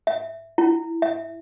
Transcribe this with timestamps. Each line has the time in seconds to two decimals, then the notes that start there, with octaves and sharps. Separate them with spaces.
0.07 E5
0.58 E4
1.02 E5